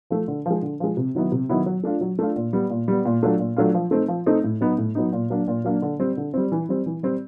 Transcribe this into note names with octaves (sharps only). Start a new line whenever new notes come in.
F3 A3
D3
F3 G#3
D3
F3 G#3
C3
D#3 F#3 B3 E4
C3
D#3 F#3 B3 E4
F#3
A3 D4 F4
F#3
A3 D4 F4
A#2
G3 B3
A#2
G3 B3
A#2
F#3 A3 D4 F4
A#2
F#3 A3 D4 F4
F3
A3 C4 D#4
F3
A3 C4 D#4
A2
F#3 B3 D#4
A2
F#3 B3 D#4
A#2
F#3 A#3 D4
A#2
F#3 A#3 D4
D3
G3 C4
D3
G3 C4
E3
G3 C4
E3
G3 C4